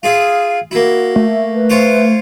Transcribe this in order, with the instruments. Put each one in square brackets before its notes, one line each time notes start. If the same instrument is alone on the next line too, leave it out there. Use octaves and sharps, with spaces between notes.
[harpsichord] F4 G#4 E5 [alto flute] F5
[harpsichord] A#3 E4 [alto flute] F#4
[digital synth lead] A3
[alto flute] B4
[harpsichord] F4 C5 C#5